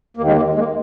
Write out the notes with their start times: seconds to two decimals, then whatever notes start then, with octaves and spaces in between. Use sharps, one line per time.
0.17 D#2 D#3 A#3
0.27 G#3
0.36 A#3
0.54 G#3
0.59 A#3